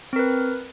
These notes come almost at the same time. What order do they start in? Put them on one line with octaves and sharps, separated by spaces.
C4 A#4 B4